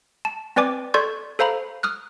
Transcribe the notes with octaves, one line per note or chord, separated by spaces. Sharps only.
A5
C4 B4 D5 G#5 D6
A4 D5 C6 C#6 G6 G#6
A4 C5 F5 A#5 B5
D#6 F6 F#6